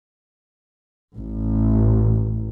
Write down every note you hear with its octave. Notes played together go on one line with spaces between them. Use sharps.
A1